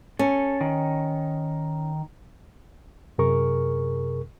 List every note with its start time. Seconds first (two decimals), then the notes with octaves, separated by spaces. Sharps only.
0.19 C#4 A4
0.61 D#3
3.18 F#2 C3 G#4 A#4 C#6